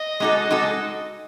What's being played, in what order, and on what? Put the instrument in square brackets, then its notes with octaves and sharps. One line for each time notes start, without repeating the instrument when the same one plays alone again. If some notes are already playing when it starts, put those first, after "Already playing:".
Already playing: [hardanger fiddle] D#5
[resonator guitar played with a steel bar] G#3 D#4 F#4 A4
G#3 D#4 F#4 A4